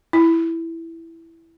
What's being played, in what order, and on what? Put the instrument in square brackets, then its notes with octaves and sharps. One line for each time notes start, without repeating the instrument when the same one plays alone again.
[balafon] E4